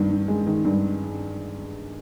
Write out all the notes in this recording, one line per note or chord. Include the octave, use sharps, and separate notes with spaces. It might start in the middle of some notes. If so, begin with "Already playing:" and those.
Already playing: G2 D#3
G2
G#3
D#3
G2